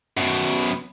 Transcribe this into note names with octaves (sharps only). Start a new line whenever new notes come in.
F#2 B2